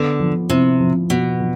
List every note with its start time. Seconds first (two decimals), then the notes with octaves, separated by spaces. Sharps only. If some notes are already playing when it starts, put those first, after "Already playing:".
Already playing: D3 B3
0.20 F3
0.50 C3 E4
0.80 F3
1.10 B2 B3
1.40 F3